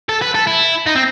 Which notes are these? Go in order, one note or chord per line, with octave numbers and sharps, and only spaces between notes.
A4
B4
A4
E4
D#4
C4